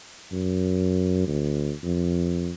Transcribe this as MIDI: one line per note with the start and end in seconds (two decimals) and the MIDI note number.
0.32 1.26 42
1.27 1.73 38
1.83 2.52 41